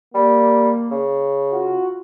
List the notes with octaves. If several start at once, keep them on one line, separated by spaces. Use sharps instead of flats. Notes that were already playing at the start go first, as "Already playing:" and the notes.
G3 A#3
C#3
F4 F#4